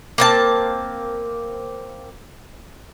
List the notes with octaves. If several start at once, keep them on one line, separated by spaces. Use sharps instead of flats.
A#3 C4 A5